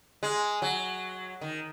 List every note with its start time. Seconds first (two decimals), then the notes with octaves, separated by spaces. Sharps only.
0.23 G#3
0.62 F#3
1.41 D#3